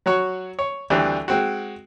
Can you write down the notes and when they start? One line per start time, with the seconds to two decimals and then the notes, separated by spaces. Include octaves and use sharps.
0.06 F#3 F#4 C#5
0.59 C#5
0.90 D2 E3 G3 C4 D4
1.28 G#3 C4 F#4